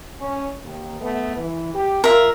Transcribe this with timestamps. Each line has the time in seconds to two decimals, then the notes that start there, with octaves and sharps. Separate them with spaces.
0.19 C#4
0.62 D#2
0.99 A3 B3
1.36 E3
1.74 G4
2.04 F4 A#4 E5